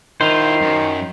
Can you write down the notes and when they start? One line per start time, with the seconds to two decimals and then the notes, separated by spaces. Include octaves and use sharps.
0.21 D#3 E4 F4 C5
0.61 F#2